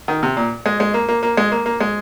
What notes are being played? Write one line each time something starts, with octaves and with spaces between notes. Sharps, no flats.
D#3
C3
A#2
G#3
G#3
A#3
A#3
A#3
G#3
A#3
A#3
G#3